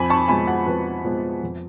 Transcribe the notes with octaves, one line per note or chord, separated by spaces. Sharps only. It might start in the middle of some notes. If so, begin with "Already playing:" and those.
Already playing: F2 G#5 B5
A5 C#6
F3 G#3 B3 G#5 B5
F#5 A5
F2 B4
F3 G#3 B3
F2